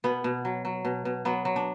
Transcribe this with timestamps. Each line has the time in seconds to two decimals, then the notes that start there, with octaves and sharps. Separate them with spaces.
0.04 B2 B3
0.24 B2
0.45 F#3
0.65 F#3
0.85 B2
1.05 B2
1.25 F#3 B3
1.45 F#3
1.56 D4